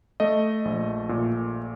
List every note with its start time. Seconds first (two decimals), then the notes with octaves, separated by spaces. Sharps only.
0.20 A3 D#5
0.65 A#1
1.09 A#2